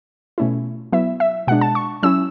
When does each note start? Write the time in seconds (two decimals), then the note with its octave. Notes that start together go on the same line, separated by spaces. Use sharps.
0.38 B2 A3 C#4 E4
0.92 F#3 B3 E4 E5
1.20 E5
1.48 B2 G#3 D4 F#5
1.61 A5
1.75 C#6
2.03 F#3 C#4 E4 E6